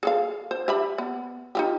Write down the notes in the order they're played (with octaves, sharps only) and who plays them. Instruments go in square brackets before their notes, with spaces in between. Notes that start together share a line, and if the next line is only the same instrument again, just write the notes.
[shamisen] G#4 A4 F5
C5
G4 E5 B5
B3
D#4 F4 G4